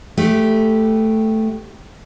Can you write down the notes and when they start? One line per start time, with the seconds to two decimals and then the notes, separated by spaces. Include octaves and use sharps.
0.17 A3 B3 G4